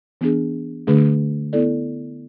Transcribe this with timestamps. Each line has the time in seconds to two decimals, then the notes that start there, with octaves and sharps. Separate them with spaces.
0.21 E3 B3 D4 G#4
0.87 D3 A3 D4 G#4
1.53 B3 E4 A4 D5